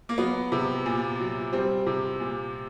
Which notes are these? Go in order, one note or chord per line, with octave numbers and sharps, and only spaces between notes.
A#3
F#3 B3
C3
A#2
F#3
G3 C4
C3
A#2